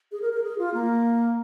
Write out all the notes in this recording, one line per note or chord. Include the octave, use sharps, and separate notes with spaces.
G#4
A#4
A#4
G#4
F4
A#3